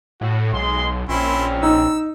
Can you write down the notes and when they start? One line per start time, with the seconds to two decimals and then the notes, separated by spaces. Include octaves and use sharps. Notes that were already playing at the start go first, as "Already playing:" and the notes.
0.21 A2 F#4
0.53 B1 G#3 C6
1.09 A#1 C4 C#4 E4 C6
1.63 D#4 E6